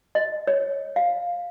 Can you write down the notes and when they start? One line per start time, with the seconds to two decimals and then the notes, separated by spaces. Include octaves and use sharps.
0.15 D#5
0.47 C#5
0.96 F5